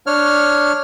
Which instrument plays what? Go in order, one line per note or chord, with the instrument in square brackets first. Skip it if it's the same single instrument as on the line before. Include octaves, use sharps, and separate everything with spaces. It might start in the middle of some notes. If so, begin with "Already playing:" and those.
[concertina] D4 C#5 F6